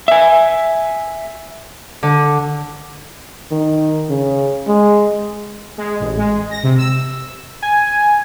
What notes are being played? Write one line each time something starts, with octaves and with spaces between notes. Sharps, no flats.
E5 G#5
D3
D#3
C#3
G#3
G#3
A1
G#3
A#6
C3
E6
G#5